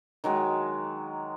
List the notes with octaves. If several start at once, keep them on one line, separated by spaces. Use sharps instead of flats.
D#3 F#3 G#3